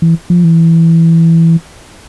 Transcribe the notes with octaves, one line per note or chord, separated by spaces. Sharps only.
E3
F3
E3